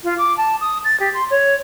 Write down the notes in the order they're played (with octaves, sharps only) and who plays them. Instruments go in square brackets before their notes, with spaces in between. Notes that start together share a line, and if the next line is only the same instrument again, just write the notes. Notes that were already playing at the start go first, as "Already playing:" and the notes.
[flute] F4
D6
A5
D#6
A6
G4
C6
C#5